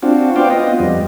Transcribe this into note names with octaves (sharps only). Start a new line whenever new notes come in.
C4 D4 F4 F#4
B3 C5 D5 F5 G5
B3 F4 D#5
F2 G3